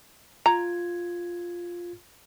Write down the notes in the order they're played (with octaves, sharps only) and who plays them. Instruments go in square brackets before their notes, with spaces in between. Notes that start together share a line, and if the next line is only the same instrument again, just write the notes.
[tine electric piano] F4 G#6 [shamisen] A#5